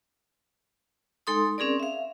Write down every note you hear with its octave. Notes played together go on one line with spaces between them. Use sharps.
G#3 D#4 A4 C6 D#6
C4 C#4 G#4 A#4 D5
E5 F5